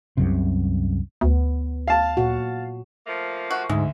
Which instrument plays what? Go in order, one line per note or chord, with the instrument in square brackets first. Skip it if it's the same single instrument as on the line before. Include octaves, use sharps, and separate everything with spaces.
[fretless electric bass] C2 F#2 C3
[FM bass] D2 [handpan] B3
[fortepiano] F5 A5
[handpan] A#2 F#4
[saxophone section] F3 A3 A#3
[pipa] F#4
[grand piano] D2 [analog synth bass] G#2 [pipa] G#3